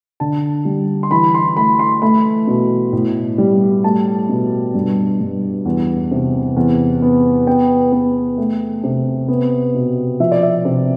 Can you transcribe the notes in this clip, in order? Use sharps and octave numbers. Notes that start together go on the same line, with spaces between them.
D3 A5
G3
C6
E3 B5
C6
A3 B5
C6
A3 B5
B2
A2
G3
A3 A5
B2
G2
G2
E2
C3
E2
B3
B3 G5
B3
A3
C3
B3
B2
F3 E5
D5
E5
C3